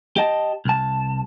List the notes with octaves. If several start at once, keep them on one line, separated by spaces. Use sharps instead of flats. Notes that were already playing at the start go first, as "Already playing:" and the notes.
G4 D#5 A5
C2 A5